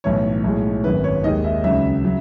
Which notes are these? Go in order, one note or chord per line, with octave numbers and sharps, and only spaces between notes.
B1 A2 E3 C#5
B1 A2 G#3
G#1 F#2 D#3 B4
C#5
D#2 D#3 G#3 D#5
E5
C#2 C#3 F#3 E5
C#3 F#3